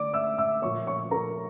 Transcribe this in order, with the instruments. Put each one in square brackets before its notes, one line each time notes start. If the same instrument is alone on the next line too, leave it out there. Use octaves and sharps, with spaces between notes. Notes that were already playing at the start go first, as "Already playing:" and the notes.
Already playing: [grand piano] D3 A3 D5 D6
E5 E6
E5 E6
A#2 F3 A#3 C#5 C#6
C#5 C#6
A#4 A#5